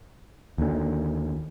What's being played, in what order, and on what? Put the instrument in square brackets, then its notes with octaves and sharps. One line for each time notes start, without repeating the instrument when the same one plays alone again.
[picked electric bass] D#2 D3